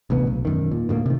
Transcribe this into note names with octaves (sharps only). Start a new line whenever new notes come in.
A1 D2 C3 B3
B1
E1 F#2 D#3
A#2
D2 A2 G3 A#3
C3 D#3